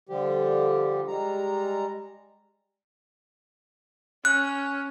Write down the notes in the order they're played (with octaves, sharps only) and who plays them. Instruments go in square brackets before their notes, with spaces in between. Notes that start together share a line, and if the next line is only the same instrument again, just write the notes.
[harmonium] D3 F3 G3 G4
G3 G#3 A#5
[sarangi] C#4 [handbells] F#6